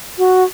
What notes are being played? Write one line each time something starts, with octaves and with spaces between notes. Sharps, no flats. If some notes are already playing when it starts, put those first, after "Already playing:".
F#4